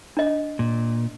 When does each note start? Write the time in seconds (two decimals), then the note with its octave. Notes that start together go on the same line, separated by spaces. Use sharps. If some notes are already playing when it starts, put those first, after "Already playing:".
0.17 D4 D#5
0.59 A#2